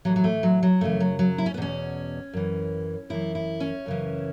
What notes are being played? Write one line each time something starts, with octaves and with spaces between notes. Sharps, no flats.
A2 E3 F#3
F#3
A3
F#3
F#3
F#2 C#3 E3 A3
F#3
F#3
E4
C#4
B3
E2 B2 C#4
F#2 E3
F#2 E3 E4
E4
C#4
F#2 C#3 E3